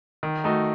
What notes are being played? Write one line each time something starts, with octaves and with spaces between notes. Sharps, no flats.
D#3
A3 D#4 F#4